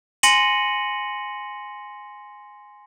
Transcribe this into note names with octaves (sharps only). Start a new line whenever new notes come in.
G#5 C6 A#6 C#7 D#7 F#7